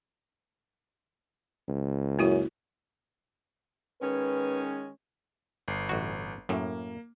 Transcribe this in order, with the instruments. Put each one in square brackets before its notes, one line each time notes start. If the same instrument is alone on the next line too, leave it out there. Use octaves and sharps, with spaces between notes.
[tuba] C#2
[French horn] F#2 [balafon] A#3 E4 F#4
[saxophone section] D#3 G#3 C#4 [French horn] B4
[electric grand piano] G1 C7
[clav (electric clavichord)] A1 F#4
[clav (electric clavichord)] F#2 A2 [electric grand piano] A#3